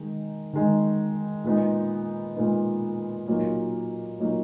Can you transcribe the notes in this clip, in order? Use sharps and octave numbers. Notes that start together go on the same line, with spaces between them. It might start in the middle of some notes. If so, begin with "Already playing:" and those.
Already playing: D#3 G#3 D#4
D#3 G#3 D#4
A#2 G#3 B3 D#4
A#2 G#3 B3 D#4
A#2 F#3 A#3 D#4
A#2 F#3 A#3 D#4